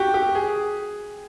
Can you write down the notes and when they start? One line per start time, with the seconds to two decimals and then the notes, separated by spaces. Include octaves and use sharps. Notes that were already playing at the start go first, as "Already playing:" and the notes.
Already playing: F#4 G4
0.14 G4
0.35 G#4